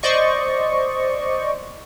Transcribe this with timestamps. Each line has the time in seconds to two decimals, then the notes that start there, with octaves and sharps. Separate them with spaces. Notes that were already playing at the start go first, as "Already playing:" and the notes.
0.03 C5 D5 D#5 C#6